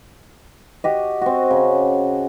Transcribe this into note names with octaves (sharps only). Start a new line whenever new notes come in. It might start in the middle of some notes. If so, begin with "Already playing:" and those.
F#4 G4 D#5
C4 F#4
C#3